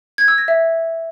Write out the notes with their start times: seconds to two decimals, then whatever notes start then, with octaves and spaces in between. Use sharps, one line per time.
0.18 G#6
0.28 E6
0.38 A#6
0.48 E5